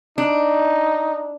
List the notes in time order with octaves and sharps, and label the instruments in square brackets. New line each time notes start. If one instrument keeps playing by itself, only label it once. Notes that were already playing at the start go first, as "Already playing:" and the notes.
[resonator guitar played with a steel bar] D4 [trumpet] D#4